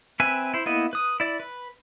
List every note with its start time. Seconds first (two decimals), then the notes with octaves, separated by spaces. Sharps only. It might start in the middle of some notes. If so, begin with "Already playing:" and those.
0.20 C4 B4 E5 G#5
0.54 E4 C5
0.66 A#3 B3 E4 D#5
0.93 B4 D#6
1.20 E4 D5
1.40 B4